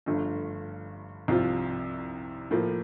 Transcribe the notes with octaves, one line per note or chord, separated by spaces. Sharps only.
G1 G2 F3 A3
C2 C3 F3 C4 F4
A2 F3 A#3